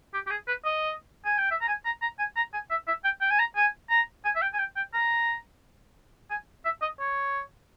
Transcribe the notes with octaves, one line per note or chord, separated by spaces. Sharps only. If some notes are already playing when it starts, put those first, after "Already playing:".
G4
G4
G#4
B4
D#5
G#5
G5
E5
A#5
G#5
A#5
A#5
G#5
A#5
G#5
E5
E5
G5
G5
G#5
A#5
G#5
A#5
G#5
E5
G5
G#5
G5
G5
A#5
G#5
E5
D#5
C#5